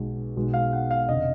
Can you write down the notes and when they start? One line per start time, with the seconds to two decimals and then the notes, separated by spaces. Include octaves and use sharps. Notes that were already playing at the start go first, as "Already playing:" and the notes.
Already playing: B1 B2 G#3
0.36 B1 B2 G#3
0.54 F5
0.73 F#5
0.91 F5
1.08 F1 D3 D#5